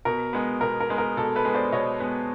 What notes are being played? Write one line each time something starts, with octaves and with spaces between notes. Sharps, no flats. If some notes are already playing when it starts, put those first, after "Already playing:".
B2 A#4
G#3 B3
B2 A#4
A#4
G#3 B3
A#4
B2 A4
A4 B4
G#3 B3
C5 D5
B2 C#5 D#5
G#3 B3